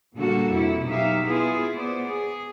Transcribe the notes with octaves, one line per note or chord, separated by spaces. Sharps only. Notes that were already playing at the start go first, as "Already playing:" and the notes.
A#2 D3 G3 A#3 F#4 A4
F2 C3 E4
B2 F#3 D#4 G4 E5 F5
B3 E4 F4 G#4 B4
B3 C5 D5
G#4